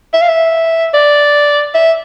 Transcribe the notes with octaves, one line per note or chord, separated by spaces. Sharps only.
E5
F5
E5
D5
E5